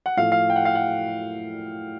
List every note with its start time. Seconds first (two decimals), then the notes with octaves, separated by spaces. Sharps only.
0.06 F#5
0.17 A2 F3 A3 F5
0.32 F5
0.50 G5
0.56 F#5
0.65 F5
0.75 F#5